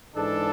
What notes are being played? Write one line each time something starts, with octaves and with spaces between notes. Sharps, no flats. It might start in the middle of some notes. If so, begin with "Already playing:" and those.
G#2 E3 G#3 D4 A4